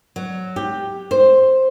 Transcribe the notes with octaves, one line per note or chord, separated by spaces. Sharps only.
F#3
G4
C5